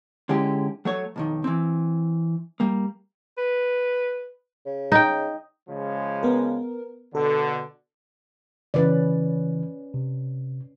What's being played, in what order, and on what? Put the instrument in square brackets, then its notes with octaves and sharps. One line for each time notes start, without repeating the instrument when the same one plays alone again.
[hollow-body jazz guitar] D3 G#3 C#4 E4 G4
F#3 A3 C#5
B1 F2 D#3
E3 C4
G3 A#3
[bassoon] B4
C#3
[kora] D#4 G5
[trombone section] C#3 F3 G#3
[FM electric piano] B3 A#4
[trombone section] B2 D3 [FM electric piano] A4
[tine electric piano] C#3 E3 [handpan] C#4 B4 D5
[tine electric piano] C3